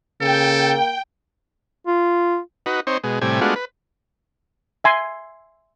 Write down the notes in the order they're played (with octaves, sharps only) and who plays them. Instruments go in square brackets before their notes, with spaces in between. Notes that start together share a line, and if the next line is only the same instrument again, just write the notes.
[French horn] C#3 [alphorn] A#3 [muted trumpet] A4 [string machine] G5
[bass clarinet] F4
[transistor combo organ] D#4 F#4 B4
C4 D#4 C5 C#5
B2 G#3
A2 C3 G3 G#5
G#3 A3 B3 D4 F4 F#4
B4
[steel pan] E5 G#5 C6